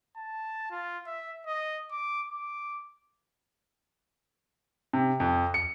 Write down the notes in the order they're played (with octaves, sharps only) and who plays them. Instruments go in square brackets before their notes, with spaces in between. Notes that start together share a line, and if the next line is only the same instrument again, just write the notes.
[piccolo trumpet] A5
F4
E5
D#5
D6
D6
[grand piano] C3
F2
C#7